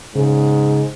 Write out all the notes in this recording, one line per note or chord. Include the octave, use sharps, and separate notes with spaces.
G#2 C#3